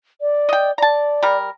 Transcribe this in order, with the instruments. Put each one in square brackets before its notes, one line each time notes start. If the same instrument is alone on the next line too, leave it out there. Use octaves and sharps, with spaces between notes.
[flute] D5
[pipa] D#5 G5
[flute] D5 [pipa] A5 A#5
[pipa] G3 A#4